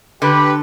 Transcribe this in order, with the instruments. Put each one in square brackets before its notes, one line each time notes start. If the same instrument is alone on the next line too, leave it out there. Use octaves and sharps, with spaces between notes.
[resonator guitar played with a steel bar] D3 [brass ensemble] G4 B4